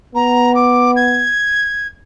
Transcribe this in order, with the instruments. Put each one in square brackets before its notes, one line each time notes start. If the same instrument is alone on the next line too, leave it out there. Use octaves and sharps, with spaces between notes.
[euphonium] B3 [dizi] A#5
[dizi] D6
G#6